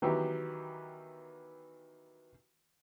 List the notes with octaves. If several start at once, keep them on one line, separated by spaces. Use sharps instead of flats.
D#3 E3 F#3 B3 G4